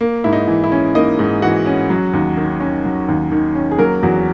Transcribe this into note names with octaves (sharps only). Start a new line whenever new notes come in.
A#3
G#2 E4
D#4
E3
E4
C#4
A#3 D#4 D#5
G#2
E3 F#4 F#5
C#4
F#3
D#2
D#3
C#4
F#3
D#2
D#3
C#4
G#4
F#3 A#3 A#4
E2 F#3 F#4